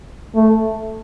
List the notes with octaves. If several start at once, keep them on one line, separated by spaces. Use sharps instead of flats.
A3